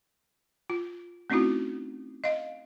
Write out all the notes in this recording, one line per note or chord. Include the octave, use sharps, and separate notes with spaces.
F4
A3 C4 C#4 D#4 E4 F#4
D#5 F5